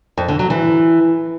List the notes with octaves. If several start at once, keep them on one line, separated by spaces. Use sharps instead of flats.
F2
D3
F#3
E3